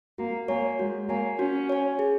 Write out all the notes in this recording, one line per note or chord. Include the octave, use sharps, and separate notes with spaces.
A#3 F#4
A#3 C#5 G#5
G#3 F#4
A#3 C#5 G#5
C#4 F#4
C#5 G#5
G#4